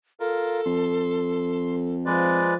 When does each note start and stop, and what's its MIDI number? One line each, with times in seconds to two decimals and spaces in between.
0.20 0.61 65
0.20 1.94 69
0.20 0.61 70
0.66 2.44 41
0.66 1.75 84
2.06 2.54 53
2.06 2.54 56
2.06 2.54 71
2.06 2.54 74
2.06 2.54 84